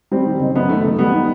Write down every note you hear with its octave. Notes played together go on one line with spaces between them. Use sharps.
G3 C4
D#3
F#1
F#2 B3
D#3 A3
F#1 A3
G3 B3
D#4